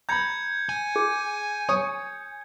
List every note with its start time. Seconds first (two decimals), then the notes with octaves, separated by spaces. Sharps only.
0.09 A#5 B5 G6 G#6 C#7
0.69 G#5
0.96 G#4
1.69 C#5 C#6 D#6